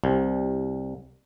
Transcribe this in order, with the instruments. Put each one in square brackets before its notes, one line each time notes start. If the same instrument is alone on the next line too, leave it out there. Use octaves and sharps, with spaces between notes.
[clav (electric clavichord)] C2